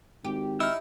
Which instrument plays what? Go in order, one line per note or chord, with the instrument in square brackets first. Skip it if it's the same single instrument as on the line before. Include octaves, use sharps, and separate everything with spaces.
[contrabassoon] G#1 [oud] G4
[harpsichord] D#4 E4 [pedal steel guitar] E6 F6